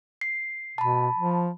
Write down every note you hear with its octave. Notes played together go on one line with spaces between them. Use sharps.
C7
B2 A5 B5
F3